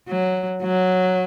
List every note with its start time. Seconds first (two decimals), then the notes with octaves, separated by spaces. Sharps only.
0.08 F#3
0.63 F#3